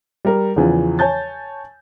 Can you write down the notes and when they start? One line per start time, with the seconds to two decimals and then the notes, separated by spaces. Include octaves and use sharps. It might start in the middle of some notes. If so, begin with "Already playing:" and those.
0.25 G3 A#4
0.56 E2 C#3 E3 F3
0.99 C#5 G#5 A5 G6 A6